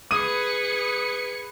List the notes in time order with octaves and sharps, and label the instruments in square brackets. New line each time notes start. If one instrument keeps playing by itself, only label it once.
[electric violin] G#4 C#7 [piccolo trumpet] B4 [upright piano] D#6 D#7